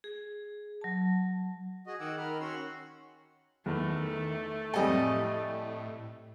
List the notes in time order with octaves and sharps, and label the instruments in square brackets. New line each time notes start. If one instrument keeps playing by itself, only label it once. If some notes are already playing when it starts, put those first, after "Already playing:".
[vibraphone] G#4
F#3 A5
[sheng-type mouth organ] F#4 D#5 [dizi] G#4
[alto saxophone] D#3 [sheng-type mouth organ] F#5 D6 E6
[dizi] A#4 [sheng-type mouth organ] B5 F6
[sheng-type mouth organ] C#4 C6 E6 [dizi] F#4
[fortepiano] E2 [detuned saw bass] D#3 [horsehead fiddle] A3
[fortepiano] F2 G3 G#5 [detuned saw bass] A2 [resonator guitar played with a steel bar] A4 D#5